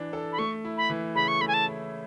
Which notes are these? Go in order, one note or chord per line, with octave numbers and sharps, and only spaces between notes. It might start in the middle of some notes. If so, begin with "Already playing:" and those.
Already playing: E3 D4
A4
B5
A3 C#6
E4
B5
E3
C#3 B5
C#6
A3 B5
G#5
A5
E4